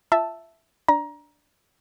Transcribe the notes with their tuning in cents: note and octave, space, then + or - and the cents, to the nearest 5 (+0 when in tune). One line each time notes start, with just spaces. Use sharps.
F4 -25 E5 +0 A5 +0
D4 +0 A#5 +20